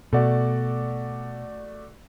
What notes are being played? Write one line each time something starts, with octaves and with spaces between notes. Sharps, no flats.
B2 A3 F#4 D5